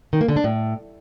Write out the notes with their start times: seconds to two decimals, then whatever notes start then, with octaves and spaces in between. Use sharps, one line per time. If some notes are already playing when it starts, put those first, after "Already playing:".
0.13 D#3
0.21 A#3
0.28 D3
0.36 D4
0.44 A2